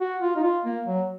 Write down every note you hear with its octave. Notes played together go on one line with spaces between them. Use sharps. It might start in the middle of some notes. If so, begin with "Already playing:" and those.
F#4
F4
D#4
F4
A#3
F#3